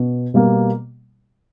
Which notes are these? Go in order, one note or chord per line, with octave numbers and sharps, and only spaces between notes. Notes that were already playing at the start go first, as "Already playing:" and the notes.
Already playing: B2
B2 G3 A#3